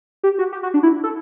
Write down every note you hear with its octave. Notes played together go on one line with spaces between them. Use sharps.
G4
F#4
G4
F#4
D4
E4
A4